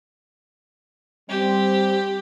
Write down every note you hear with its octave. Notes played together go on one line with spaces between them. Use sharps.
G3 C4 G4